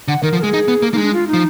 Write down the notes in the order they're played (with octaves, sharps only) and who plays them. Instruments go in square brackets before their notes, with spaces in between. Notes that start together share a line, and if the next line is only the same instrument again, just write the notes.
[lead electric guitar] D3 [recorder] F#5
[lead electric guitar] D#3 [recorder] A#4
[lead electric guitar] F3
[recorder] A#4
[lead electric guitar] G#3 [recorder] G#4
[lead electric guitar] D#4
B3
A#3
[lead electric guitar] A#3 [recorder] D#4
[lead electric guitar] G#3
[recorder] D4
F4
D#4
[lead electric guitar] F3